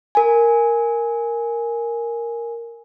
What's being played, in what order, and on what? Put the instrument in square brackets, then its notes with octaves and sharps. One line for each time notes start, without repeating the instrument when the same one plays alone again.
[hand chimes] A#4 G#5